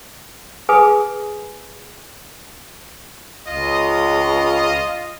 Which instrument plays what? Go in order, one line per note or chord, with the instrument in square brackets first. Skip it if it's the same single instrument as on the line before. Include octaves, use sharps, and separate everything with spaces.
[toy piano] G#4 B4 G#5 D#6
[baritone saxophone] C#2 [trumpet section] F4 D#5